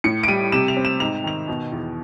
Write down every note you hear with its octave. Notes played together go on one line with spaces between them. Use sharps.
A2 C#7
D7
G3 D#7
C3 E7
F7
C4
E7
G#2 F7
D#3 F7
B2
E2